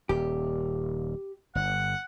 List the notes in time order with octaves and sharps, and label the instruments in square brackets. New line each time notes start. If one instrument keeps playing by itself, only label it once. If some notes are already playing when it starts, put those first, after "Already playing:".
[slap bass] D#1 [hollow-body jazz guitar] G4
[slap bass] G1 [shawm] F#5